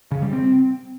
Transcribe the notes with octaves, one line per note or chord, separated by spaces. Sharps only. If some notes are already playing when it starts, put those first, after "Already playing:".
C#3
G3
C4